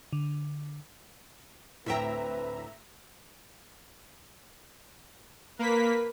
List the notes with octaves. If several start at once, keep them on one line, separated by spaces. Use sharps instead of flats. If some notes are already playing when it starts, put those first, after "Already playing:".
D3
D2 A2 A3 C4 B4 E5 G5 A#5
A#3 A#4 B4 B6